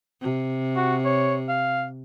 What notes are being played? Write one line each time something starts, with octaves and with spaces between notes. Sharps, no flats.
C3
F#4
C#5
F5